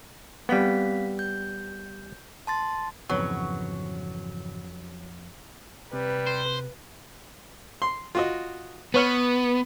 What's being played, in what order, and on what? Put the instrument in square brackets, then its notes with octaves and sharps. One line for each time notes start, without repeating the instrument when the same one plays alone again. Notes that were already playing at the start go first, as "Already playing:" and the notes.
[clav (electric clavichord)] G3 B3 [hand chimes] C4 F5 B6
[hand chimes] G6
A5 C6 A6
[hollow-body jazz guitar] F2 B3 C#4 [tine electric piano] G#2 C#3 E3 [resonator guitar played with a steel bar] F#3
[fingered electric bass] C3 C4 [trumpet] G3 [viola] B4
[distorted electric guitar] C5
[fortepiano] C6
F4 F#4 D#5
[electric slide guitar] B3 [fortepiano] B4 C#5 F6